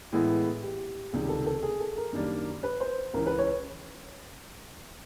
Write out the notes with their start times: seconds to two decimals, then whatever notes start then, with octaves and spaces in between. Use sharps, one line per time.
0.12 A2 E3 G#3 B3 E4
0.63 G4
1.13 C#2 C3 D#3 G3 G#4
1.29 A4
1.46 A4
1.63 G#4
1.80 A4
1.97 A#4
2.13 F#2 D#3 G3 A#3 D4
2.63 B4
2.80 C5
3.14 C#2 C#3 E3 A#4
3.26 B4
3.39 C#5